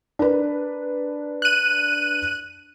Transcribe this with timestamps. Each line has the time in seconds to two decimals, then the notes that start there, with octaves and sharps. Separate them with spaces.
0.19 D4 A#4 B4
1.42 F#6 D#7